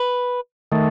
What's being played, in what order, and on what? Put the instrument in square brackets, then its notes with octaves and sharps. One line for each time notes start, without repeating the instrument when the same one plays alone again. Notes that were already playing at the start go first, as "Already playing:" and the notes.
Already playing: [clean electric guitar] B4
[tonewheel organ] D#3 A3